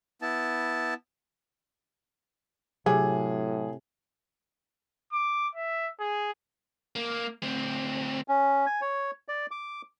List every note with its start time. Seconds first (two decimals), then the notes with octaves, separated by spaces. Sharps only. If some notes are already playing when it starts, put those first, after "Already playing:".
0.22 B3 E4 A5
2.86 A2 C3 F#3 G#4
5.12 D6
5.55 E5
6.00 G#4
6.96 A#3
7.43 D2 C4
8.28 C#4
8.66 G#5
8.81 C#5
9.28 D5
9.51 D6